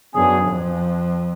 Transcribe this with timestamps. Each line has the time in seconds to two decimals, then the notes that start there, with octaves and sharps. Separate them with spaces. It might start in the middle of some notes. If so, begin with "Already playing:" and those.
0.15 F#2 F#3 B3 D4 G#4
0.48 F2